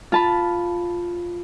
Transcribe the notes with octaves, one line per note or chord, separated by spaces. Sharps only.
F4 A5 B5